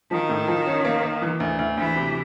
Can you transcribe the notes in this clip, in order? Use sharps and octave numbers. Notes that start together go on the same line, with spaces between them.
D#3 F3
A2
F3
C#4
A#3
A#3
E3
D2
D2
D2 E3
C3